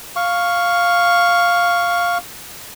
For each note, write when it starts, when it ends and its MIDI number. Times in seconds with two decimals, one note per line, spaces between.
0.16 2.18 77
0.16 2.18 85